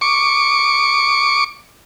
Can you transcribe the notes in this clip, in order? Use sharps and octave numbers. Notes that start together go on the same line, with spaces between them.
C#6 D6